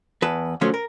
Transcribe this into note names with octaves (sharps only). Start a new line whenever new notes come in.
E2 B4 A5
D3 F3 F#3 A3 C#4
A#4